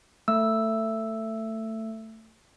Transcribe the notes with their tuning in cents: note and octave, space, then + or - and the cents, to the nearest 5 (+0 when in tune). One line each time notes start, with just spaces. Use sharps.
A3 +15 E6 +0